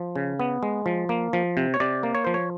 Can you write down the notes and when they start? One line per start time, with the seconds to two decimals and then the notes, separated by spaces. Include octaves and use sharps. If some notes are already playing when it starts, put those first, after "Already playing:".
Already playing: F3
0.15 C#3
0.40 B3
0.63 G#3
0.86 F3
1.09 A#3
1.33 F3
1.57 C3
1.74 C#5
1.80 C3 D5
2.03 A#3
2.15 C#5
2.25 F3 C5
2.34 C#5